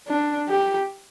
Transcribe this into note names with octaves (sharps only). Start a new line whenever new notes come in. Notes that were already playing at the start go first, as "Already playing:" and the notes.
D4
G4